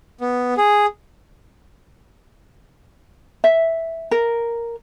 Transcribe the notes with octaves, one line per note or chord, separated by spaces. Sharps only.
B3
G#4
E5
A#4